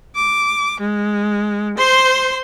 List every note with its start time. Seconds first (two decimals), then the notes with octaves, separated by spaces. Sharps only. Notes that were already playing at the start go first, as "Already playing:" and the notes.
0.15 D6
0.80 G#3
1.78 C5 C6